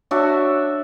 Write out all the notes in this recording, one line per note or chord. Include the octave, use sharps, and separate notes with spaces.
D4 F#4 C#5 E5